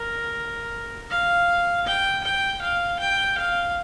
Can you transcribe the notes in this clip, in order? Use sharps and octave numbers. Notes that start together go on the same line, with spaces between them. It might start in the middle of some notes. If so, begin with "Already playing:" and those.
Already playing: A#4
F5
G5
G5
F5
G5
F5